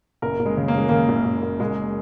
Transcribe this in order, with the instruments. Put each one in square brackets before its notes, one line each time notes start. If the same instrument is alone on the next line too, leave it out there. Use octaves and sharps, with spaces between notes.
[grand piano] F#1 A#4
F#1
G#3
C#3
A#3
C#3 G#3
C#3 A#3
F#1
F#1
F#1
F#1 G#3